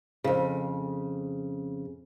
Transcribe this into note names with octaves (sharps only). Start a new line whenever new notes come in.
F2 C#3